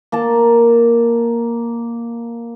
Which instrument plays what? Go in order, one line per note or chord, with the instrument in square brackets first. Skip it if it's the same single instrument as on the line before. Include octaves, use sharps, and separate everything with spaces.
[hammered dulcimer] A#3 A#4 A5